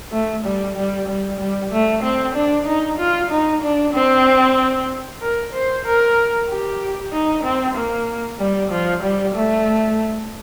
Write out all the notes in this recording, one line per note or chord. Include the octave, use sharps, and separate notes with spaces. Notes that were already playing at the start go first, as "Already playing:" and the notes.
A3
G3
G3
G3
G3
A3
C4
D4
D#4
F4
D#4
D4
C4
A#4
C5
A#4
G4
D#4
C4
A#3
G3
F3
G3
A3